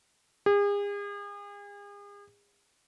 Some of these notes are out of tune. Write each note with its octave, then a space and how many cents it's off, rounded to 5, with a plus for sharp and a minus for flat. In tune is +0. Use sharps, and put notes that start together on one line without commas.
G#4 -40